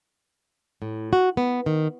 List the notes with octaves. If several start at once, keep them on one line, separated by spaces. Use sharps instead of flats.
A2
F#4
B3
D#3